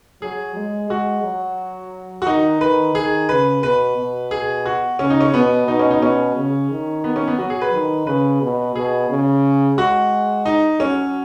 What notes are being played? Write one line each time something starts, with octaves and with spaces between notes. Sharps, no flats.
F#3 G#4
G#3
G#3 F#4
F#3
F#4
D#3 D#4
D#3 B4
D#3 G#4
C#3 B4
B2 B4
B2
G#4
F#4
C#3 C#4
D#4
C#4
B2 B3
B2 D#4
C#4
D#4
B2 C#4
C#3
D#3
B3
C#4
B3
F#3 F#4
G#4
B4
D#3
C#3 B4
B2
B2 G#4
C#3
G#3 F#4
D#4
F#3 C#4